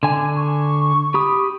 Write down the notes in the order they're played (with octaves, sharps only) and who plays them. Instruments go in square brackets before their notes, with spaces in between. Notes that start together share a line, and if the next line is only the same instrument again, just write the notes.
[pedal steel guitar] D3 G#5
[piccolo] C#6
[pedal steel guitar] G4 B5 D#6